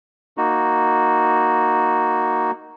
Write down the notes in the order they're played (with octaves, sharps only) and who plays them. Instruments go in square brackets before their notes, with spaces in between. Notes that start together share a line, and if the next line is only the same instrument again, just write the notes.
[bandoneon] A#3 D#4 F#4